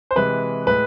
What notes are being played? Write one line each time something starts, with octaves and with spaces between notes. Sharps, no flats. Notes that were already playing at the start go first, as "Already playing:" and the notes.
C5
C3 E3 G#3 B4
A2 G#3 B4